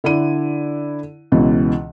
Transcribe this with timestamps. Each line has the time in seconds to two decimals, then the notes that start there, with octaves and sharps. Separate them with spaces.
0.04 D3 E4 D5 D#7
1.32 C#2 B2 E3